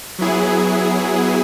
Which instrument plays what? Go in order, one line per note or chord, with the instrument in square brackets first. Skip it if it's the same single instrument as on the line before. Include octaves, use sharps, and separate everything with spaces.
[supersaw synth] F#3 B3 E4 G#4